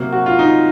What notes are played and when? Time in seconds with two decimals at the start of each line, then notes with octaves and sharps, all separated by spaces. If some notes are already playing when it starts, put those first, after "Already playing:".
Already playing: C3 F#3 A#3
0.13 F#4
0.26 F4
0.39 D#4